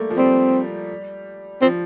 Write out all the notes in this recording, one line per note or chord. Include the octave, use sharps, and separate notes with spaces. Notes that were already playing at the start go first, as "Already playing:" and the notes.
Already playing: G3 A3 A#3
F3
G3 C4
F3 C4